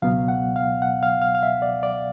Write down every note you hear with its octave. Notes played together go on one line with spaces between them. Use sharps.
C#2 B2 F#3 B3 F5
F#5
F5
F#5
F5
F5
F5
E5
D5
D5